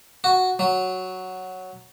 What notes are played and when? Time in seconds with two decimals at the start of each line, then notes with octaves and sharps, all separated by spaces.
0.24 F#4
0.59 F#3